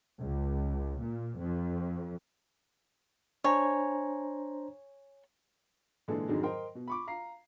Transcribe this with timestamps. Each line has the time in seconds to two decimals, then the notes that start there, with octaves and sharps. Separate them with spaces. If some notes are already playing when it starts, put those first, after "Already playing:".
0.19 C#2
1.01 A#2
1.40 F2
3.44 D4 C5 C#5 G#5 A#5
6.08 A#2 D3 E3 G#3 G#4 A4
6.28 F2 G#2 D3 D#3 F#3 G#3
6.43 A#4 C5 D#5 G5 C6
6.75 B2
6.88 B5 C#6 D6
7.07 F5 A#5 C7